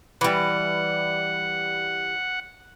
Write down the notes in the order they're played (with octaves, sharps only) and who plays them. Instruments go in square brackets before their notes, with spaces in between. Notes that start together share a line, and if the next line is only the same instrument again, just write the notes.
[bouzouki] E3 G3 [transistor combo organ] F#5